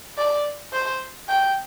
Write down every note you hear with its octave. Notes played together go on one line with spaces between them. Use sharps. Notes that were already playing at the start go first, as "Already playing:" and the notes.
D5
C5
G5